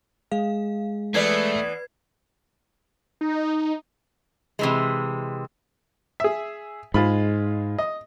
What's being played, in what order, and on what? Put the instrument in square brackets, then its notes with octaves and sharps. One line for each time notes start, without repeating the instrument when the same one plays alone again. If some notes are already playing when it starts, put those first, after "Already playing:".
[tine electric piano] G#3 G#4 [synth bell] F5
[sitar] E3 B3 D5 [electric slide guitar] A3 [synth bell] B4 G#6 C7
[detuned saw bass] D#4
[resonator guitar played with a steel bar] C3 E3 G#3
[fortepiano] G#4 E5
[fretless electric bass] G#2 [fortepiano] G#3 F4 B5
[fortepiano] D#5